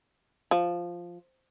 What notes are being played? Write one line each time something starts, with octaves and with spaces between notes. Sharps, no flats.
F3